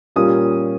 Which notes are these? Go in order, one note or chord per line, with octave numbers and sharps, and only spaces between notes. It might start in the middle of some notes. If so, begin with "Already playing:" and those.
A#2 G3 A#3 C#4 F4 D#6